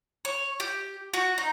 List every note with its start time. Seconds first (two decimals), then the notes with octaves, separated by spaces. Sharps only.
0.25 C#5
0.60 G4
1.14 F#4
1.38 D#4